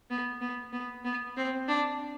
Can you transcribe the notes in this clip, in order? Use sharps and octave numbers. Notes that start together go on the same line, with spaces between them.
B3
B3
B3
B3
C4
D4